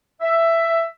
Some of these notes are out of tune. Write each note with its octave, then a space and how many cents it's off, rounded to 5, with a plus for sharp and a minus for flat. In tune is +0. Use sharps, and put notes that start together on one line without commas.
E5 +10